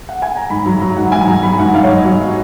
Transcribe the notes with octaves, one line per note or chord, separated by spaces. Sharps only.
F#5
G#5
A#5
G#2 B5
F#3 A#5
F#3 A#5
G#2 F#5
G#2 G#5
F#3 A#5
F#3 B5
G#2 F#5
G#2 F5
C#5
F#3 D#5
F#3